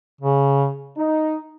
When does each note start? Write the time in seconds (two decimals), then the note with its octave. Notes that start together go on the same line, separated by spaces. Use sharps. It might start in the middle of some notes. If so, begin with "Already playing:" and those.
0.21 C#3
0.97 D#4